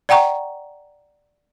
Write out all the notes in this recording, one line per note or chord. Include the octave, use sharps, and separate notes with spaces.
D5 F#5 G5 A#5 C#6